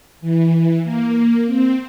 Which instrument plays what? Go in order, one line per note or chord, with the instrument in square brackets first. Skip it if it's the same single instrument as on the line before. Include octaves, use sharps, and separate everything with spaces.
[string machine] E3
A#3
C4